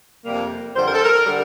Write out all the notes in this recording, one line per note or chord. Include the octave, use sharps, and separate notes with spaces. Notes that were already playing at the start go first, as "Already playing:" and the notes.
F2 C3 G3 A#3
F2 D3 G3 C5
A#4
A4
A#4
D3 G3